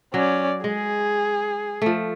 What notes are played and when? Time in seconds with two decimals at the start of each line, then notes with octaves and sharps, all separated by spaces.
0.14 F#3 C#4 D5
0.64 G#3 G#4
1.82 F3 A3